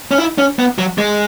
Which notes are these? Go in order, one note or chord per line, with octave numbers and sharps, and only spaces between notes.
C#4
E4
C#4
B3
F#3
G#3